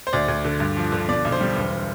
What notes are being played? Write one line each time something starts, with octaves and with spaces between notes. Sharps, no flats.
C5
D2 D5
D2
D3
G2
F3
D3
B2 D5
B1
C5
G3
E1